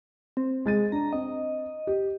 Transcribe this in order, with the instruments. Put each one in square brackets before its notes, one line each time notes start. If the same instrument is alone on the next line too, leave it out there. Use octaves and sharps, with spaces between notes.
[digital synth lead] C4
[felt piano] G#3 A6 D#7
[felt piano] D4 [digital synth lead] A#5
[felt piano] C4 [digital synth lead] D#5
[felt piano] G4